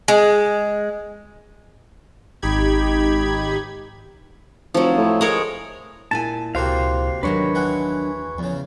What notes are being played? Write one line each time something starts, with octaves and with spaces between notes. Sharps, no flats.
G#3
G#1 D#4 G4 B5 G#6
F1 F3 F#3
A2
G#3 A#4 C#5
A#2 E4 G#5 A5
C#2 C3 A#3 F#4 C5 F5
D#2 D#3 F#3 D4 B4 C#5
E3 G#3 F#5
E2 C#3 F3